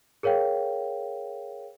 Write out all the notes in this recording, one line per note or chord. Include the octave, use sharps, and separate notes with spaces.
G#4 A#4 C#5 F5 G5